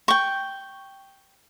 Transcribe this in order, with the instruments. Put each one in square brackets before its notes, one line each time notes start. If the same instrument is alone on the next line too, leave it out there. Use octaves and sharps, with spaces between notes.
[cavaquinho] G5 C#6